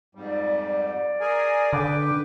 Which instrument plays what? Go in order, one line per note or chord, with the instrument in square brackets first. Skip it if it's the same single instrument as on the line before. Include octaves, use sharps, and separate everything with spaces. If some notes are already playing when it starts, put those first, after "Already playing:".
[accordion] F2 G#2 G3
[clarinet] D5
[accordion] G#4 A#4 G#5
[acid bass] D3 [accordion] B4 G5 [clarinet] D6